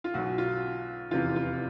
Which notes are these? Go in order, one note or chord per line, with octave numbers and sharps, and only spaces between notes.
F4
B1 B2 F#3 F#4
F4
F1 E2 C3 E3 F4
F4